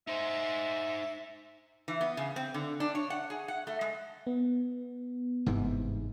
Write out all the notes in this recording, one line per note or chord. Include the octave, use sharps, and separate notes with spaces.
D#4 C5 E5
E3
B3
C#3
C4
D3
D4
C#5
F#5
G#4
F#5
A3
G#3
B3
G1 G#2 C3 E3